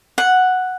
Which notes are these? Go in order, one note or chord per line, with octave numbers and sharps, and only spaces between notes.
F#5